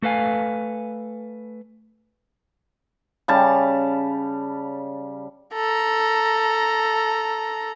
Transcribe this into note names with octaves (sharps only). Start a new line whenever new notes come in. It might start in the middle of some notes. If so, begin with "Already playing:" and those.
A3 A4 B4 F5 G#5
C#3 G3 A5
A4 A#5